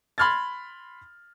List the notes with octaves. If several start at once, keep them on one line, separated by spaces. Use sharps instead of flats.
B5 C6 F6 G#6 A6